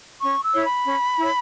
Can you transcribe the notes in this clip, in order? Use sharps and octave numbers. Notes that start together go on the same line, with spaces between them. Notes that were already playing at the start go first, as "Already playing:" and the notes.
C#4 C#6
E6
E4 C#5
B5
C#4
E4 C#5